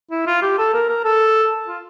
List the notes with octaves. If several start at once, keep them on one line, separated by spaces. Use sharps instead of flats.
E4
F4
G4
A4
A#4
A#4
A4
F4